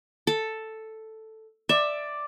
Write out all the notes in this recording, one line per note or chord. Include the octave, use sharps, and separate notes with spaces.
A4
D5 E5